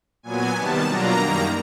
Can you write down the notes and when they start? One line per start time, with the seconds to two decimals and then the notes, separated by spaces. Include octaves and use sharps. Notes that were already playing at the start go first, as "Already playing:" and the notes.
0.23 A#2 F#3 B3 G#5
0.54 C3 D#3 G3 B3 A5
0.86 B2 F#3 A#3 D4 F4 A#5
1.17 F#2 D#3 G3 A#3